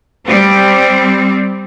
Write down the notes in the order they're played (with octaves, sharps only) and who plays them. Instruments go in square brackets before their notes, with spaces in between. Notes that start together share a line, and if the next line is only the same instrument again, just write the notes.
[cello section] G3 C4